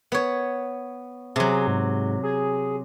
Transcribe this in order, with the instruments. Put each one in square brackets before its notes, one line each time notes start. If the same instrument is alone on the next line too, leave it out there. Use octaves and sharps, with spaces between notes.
[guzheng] B3 C#5
[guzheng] C3 F#3 [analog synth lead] G#4
[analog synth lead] G#2
G#4